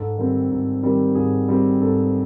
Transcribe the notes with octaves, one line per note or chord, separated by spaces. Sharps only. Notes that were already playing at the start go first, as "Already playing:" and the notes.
Already playing: G#2 A4
D#3 G3 C4
G#2
D#3 G3 C4
G#2 G#4
D#3 G3 C4
G#2 A4